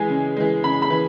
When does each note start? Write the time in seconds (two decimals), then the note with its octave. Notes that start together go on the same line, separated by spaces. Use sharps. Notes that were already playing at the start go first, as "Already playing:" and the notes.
Already playing: E3 G#3 G#5
0.10 C#3
0.37 E3 G#3
0.63 C#3 B5
0.82 B5
0.90 E3